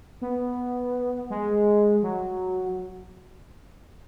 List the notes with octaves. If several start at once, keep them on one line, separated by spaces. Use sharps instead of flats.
B3
G#3
F#3